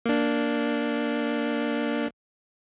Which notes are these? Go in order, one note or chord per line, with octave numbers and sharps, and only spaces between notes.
A#3 D4